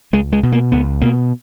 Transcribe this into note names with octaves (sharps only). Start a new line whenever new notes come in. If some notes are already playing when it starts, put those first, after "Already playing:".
C#2 G#3
G#3
B2
A#3
C#2 B3
B2 A#3